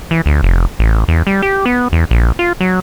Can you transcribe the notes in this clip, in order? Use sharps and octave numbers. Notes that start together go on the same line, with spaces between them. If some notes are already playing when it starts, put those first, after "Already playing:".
E3
D2
F1
A1
E2
G3
G4
B3
E2
A#1
F4
F#3